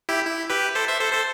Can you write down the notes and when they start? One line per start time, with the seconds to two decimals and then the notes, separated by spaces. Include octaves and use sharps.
0.09 E4 G4
0.26 E4
0.50 G4 B4
0.75 A4 C5
0.88 C5 E5
1.00 A4 C5
1.12 A4 C5